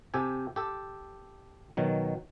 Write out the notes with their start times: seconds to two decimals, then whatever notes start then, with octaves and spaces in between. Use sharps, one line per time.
0.14 C3 G4 A4 G#5
0.56 G4 A4
1.77 B2 D#3 F#3